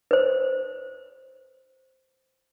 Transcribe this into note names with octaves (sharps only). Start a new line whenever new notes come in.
B4 C5